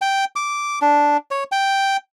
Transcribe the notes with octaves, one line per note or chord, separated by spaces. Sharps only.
G5
D6
D4
C#5
G5